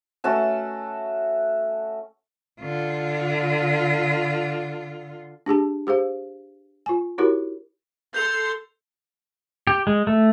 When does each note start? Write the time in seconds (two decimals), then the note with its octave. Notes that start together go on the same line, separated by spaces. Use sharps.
0.24 A3 C#4 F#4 A5
2.61 D3 F4
5.46 D4 G4 G#4 A5
5.87 G4 G#4 C5 F5
6.86 F4 G#5
7.18 D#4 E4 F#4 G4 A#4 C#5
8.14 A4 C6 G6 F7
9.67 G4
9.87 G#3
10.07 A3